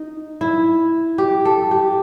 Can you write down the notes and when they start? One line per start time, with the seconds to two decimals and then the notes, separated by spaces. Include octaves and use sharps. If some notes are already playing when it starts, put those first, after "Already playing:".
Already playing: D#4
0.41 E4
1.18 G4
1.45 A4
1.71 G4